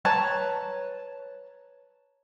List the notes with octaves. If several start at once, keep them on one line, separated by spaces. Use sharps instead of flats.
B4 C#5 A5 A#5